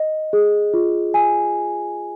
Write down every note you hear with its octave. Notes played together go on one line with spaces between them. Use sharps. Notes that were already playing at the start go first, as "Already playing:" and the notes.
Already playing: D#5
G#4
F4
G#5